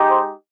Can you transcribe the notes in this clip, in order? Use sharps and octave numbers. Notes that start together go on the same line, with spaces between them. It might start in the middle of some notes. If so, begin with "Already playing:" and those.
Already playing: G#3 D#4 G4
C5